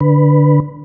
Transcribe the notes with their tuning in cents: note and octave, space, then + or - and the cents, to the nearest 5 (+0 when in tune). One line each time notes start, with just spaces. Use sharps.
D3 +0 B4 +0